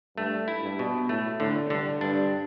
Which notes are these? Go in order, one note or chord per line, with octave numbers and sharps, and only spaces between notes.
G2 A3
E4
G2
B2
A2 A3
A2 D3
G2 D3
G2 D4